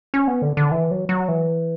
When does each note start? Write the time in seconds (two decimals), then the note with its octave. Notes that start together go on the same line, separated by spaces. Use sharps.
0.14 C#4
0.28 B3
0.42 D3
0.57 D3
0.71 E3
0.91 F#3
1.09 F#3
1.28 E3